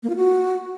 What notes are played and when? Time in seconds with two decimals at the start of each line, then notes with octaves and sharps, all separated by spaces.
0.03 A#3
0.10 F4
0.16 F#4